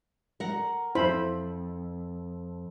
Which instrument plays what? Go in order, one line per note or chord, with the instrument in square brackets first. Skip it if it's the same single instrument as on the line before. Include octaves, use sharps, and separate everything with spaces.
[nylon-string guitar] A#4 F#5
[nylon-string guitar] F2 [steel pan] E4 C5 B5